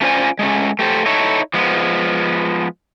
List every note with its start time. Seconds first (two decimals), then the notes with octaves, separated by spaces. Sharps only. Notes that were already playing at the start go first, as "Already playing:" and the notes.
0.01 A3 C#4 F4 C5 D5 G#5
0.39 G#3 A3 C#4
0.79 A3 G4 A4 C5
1.06 D#4 E4 A4 C#5
1.54 F3 G#3 B3